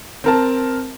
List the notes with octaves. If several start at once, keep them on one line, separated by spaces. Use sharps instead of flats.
C4 A#4 A5